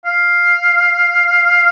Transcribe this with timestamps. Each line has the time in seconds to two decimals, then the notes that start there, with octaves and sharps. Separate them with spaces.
0.05 F5